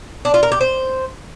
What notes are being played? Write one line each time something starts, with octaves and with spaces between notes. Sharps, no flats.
D4
F4
A#4
G4
C5